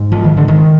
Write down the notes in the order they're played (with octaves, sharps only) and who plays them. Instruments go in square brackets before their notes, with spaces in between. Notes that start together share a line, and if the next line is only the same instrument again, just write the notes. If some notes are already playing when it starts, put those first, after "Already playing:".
Already playing: [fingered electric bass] G#2
F3
D#3
D3
D#3